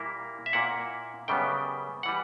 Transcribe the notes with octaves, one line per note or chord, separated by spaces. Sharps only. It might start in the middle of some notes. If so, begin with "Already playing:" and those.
Already playing: A#2 G3 A#3 E4
E5
A#2 A#3 E4 F#5
F#2 C#3 G3 B3 G5
E3 G3 F#5